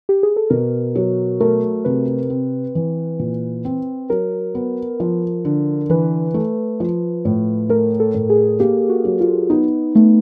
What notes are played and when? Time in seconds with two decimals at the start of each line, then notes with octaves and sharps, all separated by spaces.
0.09 G4
0.23 G#4
0.36 A4
0.50 B2 A#4
0.95 F#3
1.40 A3 A#4
1.85 C3 B4
2.30 C4
2.75 E3
3.19 A#2
3.65 C4
4.10 F#3 A#4
4.55 B3
5.00 F3
5.45 D3
5.90 E3 B4
6.34 A3
6.80 F3
7.25 A2
7.69 A3 A#4
8.00 A4
8.14 A2
8.30 G#4
8.60 A#3 G4
8.89 F#4
9.05 F#3
9.20 F4
9.50 B3 D#4
9.95 A3 B3